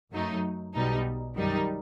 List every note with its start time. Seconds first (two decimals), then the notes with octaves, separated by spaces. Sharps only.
0.12 F#2 F#3 A3 D#4
0.74 B1 B2 G3 D#4
1.35 F#2 D#3 G3 D#4